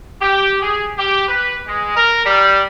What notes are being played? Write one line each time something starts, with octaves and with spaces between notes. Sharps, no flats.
G4
G#4
G4
B4
G#3
A#4
G3